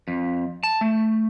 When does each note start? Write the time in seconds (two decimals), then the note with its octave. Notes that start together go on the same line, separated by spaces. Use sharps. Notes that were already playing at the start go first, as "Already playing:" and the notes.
0.08 F2
0.63 A5
0.81 A3